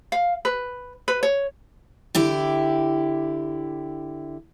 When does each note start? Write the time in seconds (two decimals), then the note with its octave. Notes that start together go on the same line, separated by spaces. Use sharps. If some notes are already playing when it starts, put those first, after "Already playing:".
0.12 F5
0.45 B4
1.08 B4
1.23 C#5
2.15 D3 E4 G4